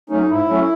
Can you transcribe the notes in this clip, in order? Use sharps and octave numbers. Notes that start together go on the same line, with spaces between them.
F#3 A3 C#4 D#4
G#2 E4
F#3 A3 C#4